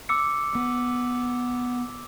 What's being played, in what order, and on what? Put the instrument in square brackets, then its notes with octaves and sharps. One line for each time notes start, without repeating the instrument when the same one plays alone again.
[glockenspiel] D6 E6 C#7
[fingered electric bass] B3